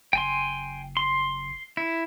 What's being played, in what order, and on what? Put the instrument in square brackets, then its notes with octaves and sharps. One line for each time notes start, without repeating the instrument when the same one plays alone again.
[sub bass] F#1 [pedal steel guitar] G5 G#5 C6
[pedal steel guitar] C6
E4